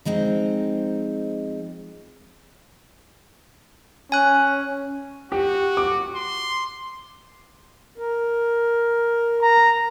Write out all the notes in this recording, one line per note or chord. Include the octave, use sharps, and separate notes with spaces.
F3 G#3 C4 D#4
C#4 G#5 F#6
F#4 G4
D6
C6
A#4
A#5